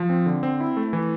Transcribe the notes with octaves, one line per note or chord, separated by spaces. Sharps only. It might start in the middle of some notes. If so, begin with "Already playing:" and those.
Already playing: F3
C4
D3
C4
E4
A3
E3